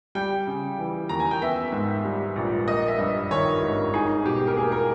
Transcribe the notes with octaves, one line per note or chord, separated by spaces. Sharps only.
G3 G5
C#3
E3
D#2 A#5
G#5
G5
B3 E5
G#2
G3
A#1
A#3 D#5
E5
G2 D#5
D#3 C#5
G#1
D#4 G#4
B2 G4
A#4
A#3 G#4
A#4